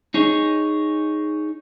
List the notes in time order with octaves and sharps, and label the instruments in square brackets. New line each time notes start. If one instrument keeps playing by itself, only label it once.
[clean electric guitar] D#4 G#4 C#5